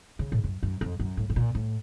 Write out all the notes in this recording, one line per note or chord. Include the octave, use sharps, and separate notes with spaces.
C#3
A2
F#2
F#2
F2
F#2
A2
A2
A#2
A2